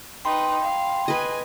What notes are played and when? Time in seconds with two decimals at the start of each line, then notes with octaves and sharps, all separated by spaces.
0.25 D#4 B4 G5 B5 C6
0.62 F5
1.08 B4 D#5 G#5